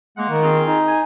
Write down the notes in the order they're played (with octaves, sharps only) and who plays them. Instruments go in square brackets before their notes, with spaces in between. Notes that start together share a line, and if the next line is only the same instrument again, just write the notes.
[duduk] G#3 [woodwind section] A#3 F#5
[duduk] D#3
[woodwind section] C4 F4 G#4
[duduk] D#4
[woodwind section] G#5